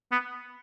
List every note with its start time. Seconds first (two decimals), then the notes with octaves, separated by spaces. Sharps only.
0.12 B3